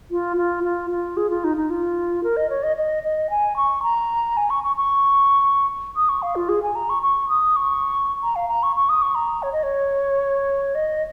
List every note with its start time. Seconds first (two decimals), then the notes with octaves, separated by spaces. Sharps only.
0.11 F4
0.37 F4
0.64 F4
0.91 F4
1.17 G#4
1.30 F4
1.44 D#4
1.57 D#4
1.70 F4
2.23 A#4
2.37 D#5
2.50 C#5
2.63 D#5
2.77 D#5
3.03 D#5
3.30 G#5
3.56 C#6
3.83 A#5
4.37 G#5
4.50 C#6
4.64 C#6
4.76 C#6
5.96 D#6
6.09 C#6
6.22 F5
6.36 F4
6.49 G#4
6.63 G#5
6.75 A#5
6.90 C#6
7.03 C#6
7.29 D#6
7.56 C#6
8.23 A#5
8.36 F5
8.49 A#5
8.63 C#6
8.76 C#6
8.89 D#6
9.02 C#6
9.15 A#5
9.43 C#5
9.53 D#5
9.63 C#5
10.75 D#5